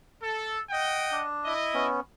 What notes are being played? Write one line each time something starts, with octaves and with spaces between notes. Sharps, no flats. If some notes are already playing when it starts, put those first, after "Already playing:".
A4
D#5 F#5 G5
D4
E4 D#5
B3 C#4